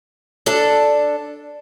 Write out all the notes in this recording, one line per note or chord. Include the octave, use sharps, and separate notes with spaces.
D4 A4